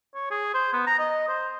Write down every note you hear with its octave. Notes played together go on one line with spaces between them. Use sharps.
C#5
G#4
C5
B3
A#5
D#5
C5